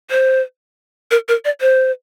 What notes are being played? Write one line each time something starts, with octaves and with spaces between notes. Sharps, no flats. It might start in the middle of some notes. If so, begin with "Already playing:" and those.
C5
A#4
A#4
D5
C5